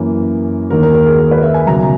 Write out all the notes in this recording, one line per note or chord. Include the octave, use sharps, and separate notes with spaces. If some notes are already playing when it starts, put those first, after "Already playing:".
Already playing: F#2 E3 A#3
D#2 D#3 A#3 A#4
A#4
A#4
G#4
A#4
B4
E5
G#5
C#2 B2 F#3 A#5